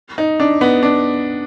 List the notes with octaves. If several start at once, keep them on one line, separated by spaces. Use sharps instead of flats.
D#4
D4
B3
D4